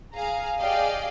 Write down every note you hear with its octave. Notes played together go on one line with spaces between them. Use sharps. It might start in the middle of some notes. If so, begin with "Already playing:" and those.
G#4 F5 G#5 A#5
G4 G#4 D5 D#5 F5